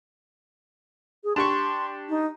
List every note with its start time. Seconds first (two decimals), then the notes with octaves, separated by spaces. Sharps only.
1.24 G#4
1.36 D4 G4 C6 C#6
2.09 D#4